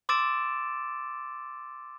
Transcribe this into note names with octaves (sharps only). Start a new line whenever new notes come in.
C6 D6 E6 A6 D7 E7